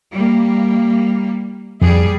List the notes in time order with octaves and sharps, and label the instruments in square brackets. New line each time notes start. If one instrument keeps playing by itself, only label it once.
[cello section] G3 A#3
[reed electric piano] F2 [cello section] G3 G#4